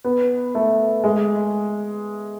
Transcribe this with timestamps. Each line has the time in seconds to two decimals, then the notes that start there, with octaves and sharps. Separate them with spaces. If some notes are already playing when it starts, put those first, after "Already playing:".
0.04 B3
0.55 A3
1.04 G#3